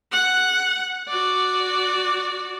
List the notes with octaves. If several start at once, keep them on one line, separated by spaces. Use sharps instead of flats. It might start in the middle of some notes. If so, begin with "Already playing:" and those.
F#5
F#4 D5